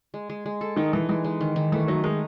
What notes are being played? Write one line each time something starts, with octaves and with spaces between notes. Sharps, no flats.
G#3
G#3
G#3
A4
D#3 D#4
E3 D#4
E3 G#3
G#3
D#3
D#3
E3 A3
F#3 D#4
G#3 D#4